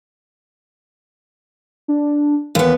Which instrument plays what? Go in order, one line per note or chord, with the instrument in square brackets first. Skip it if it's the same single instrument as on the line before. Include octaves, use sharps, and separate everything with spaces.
[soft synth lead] D4
[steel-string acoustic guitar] D#2 B3 [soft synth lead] E3